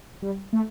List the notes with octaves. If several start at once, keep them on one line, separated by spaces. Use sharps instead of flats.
G3
A3